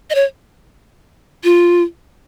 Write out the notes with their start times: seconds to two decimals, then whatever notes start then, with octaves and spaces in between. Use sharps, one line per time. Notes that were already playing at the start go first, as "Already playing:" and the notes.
0.10 D#5
0.15 C#5
1.44 F4